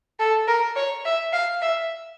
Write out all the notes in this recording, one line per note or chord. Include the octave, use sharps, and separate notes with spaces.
A4
A#4
C#5
E5
F5
E5